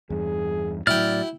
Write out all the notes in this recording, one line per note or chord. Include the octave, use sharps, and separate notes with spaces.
E2 G2 G#4
A2 F#3 E4 F#4 D5 G5 F6